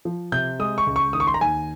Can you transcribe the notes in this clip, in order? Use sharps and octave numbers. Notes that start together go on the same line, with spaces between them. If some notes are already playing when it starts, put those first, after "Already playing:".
F3
C3 G6
G#3 D#6
C#6
C#2
C#6
D#3 D#6
C#6
C6
A#5
D#2 G#5